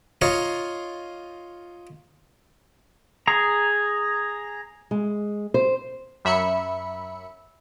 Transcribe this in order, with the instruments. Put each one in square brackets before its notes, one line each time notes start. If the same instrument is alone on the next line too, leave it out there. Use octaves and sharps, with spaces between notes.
[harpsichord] D#4 F4 C#5 D#5
[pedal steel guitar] G#4 A#5
[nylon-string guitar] G#3
C5
[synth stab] F#2 E5 B5 C#7